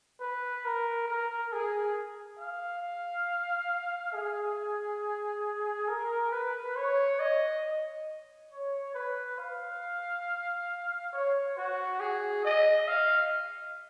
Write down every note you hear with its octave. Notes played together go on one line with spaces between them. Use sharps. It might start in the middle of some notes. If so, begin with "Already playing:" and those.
B4
A#4
A#4
G#4
F5
G#4
A#4
B4
C#5
D#5
C#5
B4
F5
C#5
F#4
G#4
D#5
F5